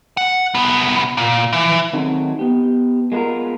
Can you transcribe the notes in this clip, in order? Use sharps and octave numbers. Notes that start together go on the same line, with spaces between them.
F#5
C2 B3
A#2
E3
D#3 F#3 A3 C4 D#4
B3 G4
G#3 A#3 B3 D4 F4 A#4